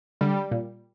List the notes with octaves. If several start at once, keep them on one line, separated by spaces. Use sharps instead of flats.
D3 G3
A#2